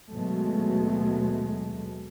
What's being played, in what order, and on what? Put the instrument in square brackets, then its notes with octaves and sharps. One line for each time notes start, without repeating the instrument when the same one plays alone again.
[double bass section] D#2 B2 F#3 G#3 A3